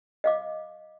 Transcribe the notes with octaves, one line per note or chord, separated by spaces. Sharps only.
D#5 F5 D6